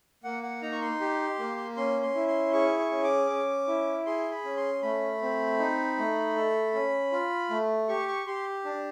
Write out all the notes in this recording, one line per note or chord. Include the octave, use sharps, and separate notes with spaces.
A#3 F#5
F#5
D#4 A#5
C#6
C6
G4
A#3
C#4 C6
C6
E4
C6
G#4 C#6
C#6
C#4
D6
C#4
E4
G#4 C6
B5
C#4
C6
A3 B5
C4
D#4
A3
A4
C#4
F4
A3
G4 C#6
C#6
G4 C6
D4